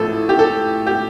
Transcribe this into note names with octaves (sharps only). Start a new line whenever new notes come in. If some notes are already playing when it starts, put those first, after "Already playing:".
Already playing: A1 A2 F3 A4
G4
A4
G4